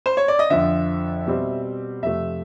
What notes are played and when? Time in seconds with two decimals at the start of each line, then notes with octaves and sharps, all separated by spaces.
0.06 C5
0.17 C#5
0.28 D5
0.39 D#5
0.50 F2 D3 F3 E5
1.26 B2 G3 C4
2.02 F2 C3 F3 A3 E5